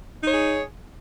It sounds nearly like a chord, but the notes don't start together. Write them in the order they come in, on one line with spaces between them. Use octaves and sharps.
D#4 C#5 G#4